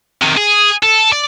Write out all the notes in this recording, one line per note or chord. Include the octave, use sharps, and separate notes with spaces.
C3 D#3
G#4
A4
D5